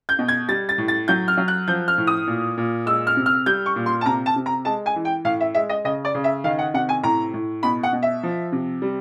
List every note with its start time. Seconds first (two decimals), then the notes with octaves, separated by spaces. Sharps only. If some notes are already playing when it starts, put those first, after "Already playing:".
0.09 G6
0.19 B2
0.28 G#6
0.49 G3 A6
0.69 A6
0.78 A2
0.88 A6
1.08 F#3 G6
1.28 F6
1.37 F#3
1.48 F#6
1.68 F3 G6
1.88 F6
1.98 A2
2.07 D#6
2.27 A#2
2.57 A#2
2.86 G#3 E6
3.07 F6
3.17 C3
3.26 F6
3.46 G3 G6
3.66 C#6
3.76 A#2
3.86 C6
4.01 A5
4.06 C3 A#5
4.26 A5
4.36 C3
4.46 A#5
4.65 G#3 A5
4.86 G#5
4.96 E3
5.05 G5
5.25 A2 F5
5.41 E5
5.55 G#3 E5
5.69 D#5
5.85 C#3 D#5
6.05 D5
6.15 C#3
6.24 E5
6.44 D#3 F5
6.59 F#5
6.74 C3 F#5
6.89 G#5
7.03 A2 A#5
7.34 A2
7.63 B2 B5
7.83 F#5
7.93 B2
8.03 E5
8.23 F3
8.52 C3
8.82 G3